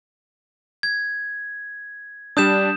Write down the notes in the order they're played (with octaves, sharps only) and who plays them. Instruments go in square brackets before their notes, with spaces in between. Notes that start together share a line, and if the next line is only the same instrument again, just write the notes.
[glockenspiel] G#6
[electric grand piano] G3 D4 [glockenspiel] D#6 G6 E7